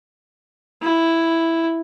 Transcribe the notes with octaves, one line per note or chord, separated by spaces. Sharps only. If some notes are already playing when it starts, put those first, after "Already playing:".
E4